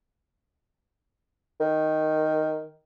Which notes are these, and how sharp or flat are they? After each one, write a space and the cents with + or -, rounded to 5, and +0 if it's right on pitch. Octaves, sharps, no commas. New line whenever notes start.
D#3 +0